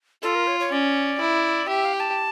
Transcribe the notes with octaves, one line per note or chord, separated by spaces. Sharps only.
F4 A4
A#4
C#5
C#5
C#4 D5
E4
G4 E5
F5
G5
A5